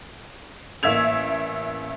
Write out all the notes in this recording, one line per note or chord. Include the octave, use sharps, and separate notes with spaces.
A1 A#3 E5 E6 G#6 F7